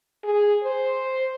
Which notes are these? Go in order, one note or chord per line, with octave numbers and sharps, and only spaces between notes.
G#4
C5